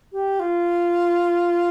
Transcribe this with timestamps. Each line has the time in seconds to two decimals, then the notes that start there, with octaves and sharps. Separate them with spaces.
0.12 G4
0.40 F4